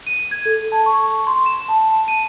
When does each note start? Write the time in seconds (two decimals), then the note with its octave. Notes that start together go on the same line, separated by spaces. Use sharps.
0.07 D#7
0.31 G#6
0.46 A4
0.72 A5
0.86 C#6
1.27 C6
1.46 E7
1.69 A5
2.08 D#7